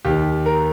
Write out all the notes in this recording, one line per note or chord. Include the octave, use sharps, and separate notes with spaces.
D#2 D#3 G4
A#4